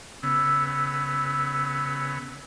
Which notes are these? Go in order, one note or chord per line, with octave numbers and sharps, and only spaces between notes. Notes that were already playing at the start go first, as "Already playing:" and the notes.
C#3 B3 E6